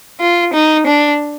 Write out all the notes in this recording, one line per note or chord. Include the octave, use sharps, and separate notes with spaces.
F4
D#4
D4